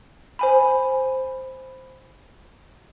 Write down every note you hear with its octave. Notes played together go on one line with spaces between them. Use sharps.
C5 G#5 B5